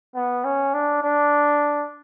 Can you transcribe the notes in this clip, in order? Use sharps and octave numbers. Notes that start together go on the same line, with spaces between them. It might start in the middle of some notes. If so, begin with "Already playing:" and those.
B3
C#4
D4
D4